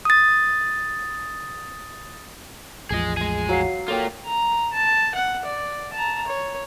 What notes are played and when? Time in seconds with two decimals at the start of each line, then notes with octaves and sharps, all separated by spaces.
0.05 D#6 A6
2.90 A1 E2 F3 G#4 D#5
3.17 G#3 G#4
3.49 F#3 F#4 F5 C7
3.88 A#3 F4 A4 C#5 G5
4.26 A#5
4.74 A5
5.15 F#5
5.45 D5
5.93 A5 A#5
6.27 C#5